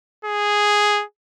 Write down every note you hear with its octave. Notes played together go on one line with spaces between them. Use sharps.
G#4